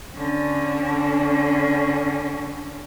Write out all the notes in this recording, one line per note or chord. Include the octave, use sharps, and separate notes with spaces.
D3 C#4